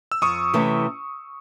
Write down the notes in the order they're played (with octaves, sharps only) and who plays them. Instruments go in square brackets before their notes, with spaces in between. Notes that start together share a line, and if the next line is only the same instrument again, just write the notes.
[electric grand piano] E6
[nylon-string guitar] F2 [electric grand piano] C#6 D#6
[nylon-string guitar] C3 E3 A3 C#4